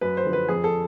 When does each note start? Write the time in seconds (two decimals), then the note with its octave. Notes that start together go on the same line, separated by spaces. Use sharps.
0.01 F#2 B4
0.17 C5
0.25 D3 F3
0.33 B4
0.48 F2 G#4
0.64 A4